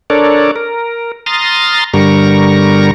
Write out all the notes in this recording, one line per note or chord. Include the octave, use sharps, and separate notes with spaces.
D4 A4 A#4 C#5 D5
A#4
A#5 C6 D#6 F6 A6
G2 D3 G3 A#4 A#5 C#6